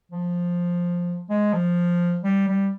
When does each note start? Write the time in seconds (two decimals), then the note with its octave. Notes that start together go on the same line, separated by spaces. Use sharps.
0.12 F3
1.30 G#3
1.53 F3
2.24 G3
2.48 G3